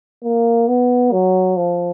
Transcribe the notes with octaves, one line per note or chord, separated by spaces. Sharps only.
A#3
B3
F#3
F3